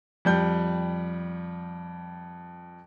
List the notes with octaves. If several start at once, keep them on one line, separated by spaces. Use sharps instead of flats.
F2 G3 G6